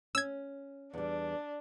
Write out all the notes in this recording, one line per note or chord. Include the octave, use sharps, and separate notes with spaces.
C#4 E6 G#6
E2 G3 D4